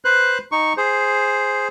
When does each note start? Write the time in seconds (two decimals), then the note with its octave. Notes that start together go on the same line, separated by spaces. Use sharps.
0.05 B4 C5 F#6
0.52 D#4 C#6
0.77 G#4 C5